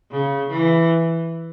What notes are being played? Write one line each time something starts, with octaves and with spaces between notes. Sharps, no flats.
C#3
E3